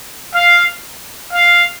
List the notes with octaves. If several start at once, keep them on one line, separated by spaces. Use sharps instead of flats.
F5
F5